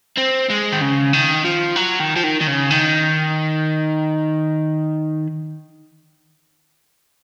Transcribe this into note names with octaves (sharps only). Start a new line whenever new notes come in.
C4
G#3
D#3
C#3
D#3
F3
F#3
D#3
F3
D#3
D#3
C#3
D#3